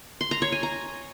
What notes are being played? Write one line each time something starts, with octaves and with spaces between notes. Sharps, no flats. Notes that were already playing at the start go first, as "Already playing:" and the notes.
C6
A#5
C#5
G#5
A#5